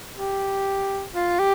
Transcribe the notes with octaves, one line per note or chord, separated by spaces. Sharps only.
G4
F4
G4